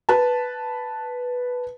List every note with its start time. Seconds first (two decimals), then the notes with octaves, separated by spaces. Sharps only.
0.09 B4 A5